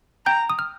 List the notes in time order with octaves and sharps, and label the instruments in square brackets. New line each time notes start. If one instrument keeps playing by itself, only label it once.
[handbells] G5 G6 [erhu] A#5
[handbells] D#6
F6